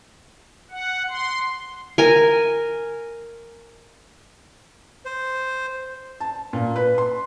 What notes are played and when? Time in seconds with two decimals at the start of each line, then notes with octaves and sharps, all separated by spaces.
0.71 F#5
1.09 C6
1.98 A#4 G#5
5.05 C5
6.20 A5
6.53 A#2
6.76 B4
6.98 C6